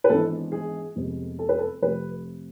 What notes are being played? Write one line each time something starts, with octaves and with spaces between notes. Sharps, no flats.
B4
G#1 G#2 E3 B3 D4 A4
G#4
F1 F2 C3 G#3 B3
A4
B4
A4
F2 C3 F3 A3 B4